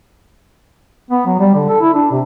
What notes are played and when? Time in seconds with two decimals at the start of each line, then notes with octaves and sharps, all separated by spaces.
1.11 B3
1.27 F#3
1.39 G3
1.55 D3
1.69 A4
1.81 E4
1.94 D4
2.11 C3